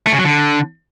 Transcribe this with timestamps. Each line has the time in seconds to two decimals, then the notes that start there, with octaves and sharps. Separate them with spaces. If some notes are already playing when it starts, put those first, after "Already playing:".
0.07 A3
0.13 C#3
0.19 F#3
0.25 D3